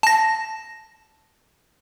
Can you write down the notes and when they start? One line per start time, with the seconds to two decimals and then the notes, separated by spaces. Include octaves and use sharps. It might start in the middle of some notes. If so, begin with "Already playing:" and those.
0.03 A5 A#6